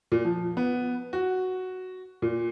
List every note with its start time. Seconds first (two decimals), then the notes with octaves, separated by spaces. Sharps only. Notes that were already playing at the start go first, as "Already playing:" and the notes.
0.12 A#2
0.25 F3
0.57 B3
1.13 F#4
2.22 A#2